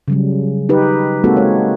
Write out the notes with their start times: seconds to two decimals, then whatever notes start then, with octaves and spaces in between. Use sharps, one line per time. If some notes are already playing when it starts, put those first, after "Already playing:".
0.08 C#3 F#3 G3
0.69 D#4 G4 B4
1.24 G#3 A#3 C4 D#4 F#4 A4
1.37 G#3 C#5